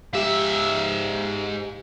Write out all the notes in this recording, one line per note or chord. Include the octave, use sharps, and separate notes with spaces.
G#2 G4 E5 F5